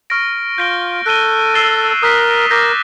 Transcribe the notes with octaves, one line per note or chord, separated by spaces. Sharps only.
C#6 F6 A#6 D7
F4 G6 A#6 D7 G7
A4 F#6 A#6 D#7 G7
E6 A6 C7 E7 G7
A#4 D#6 F#6 B6
A#4 D6 G6 A#6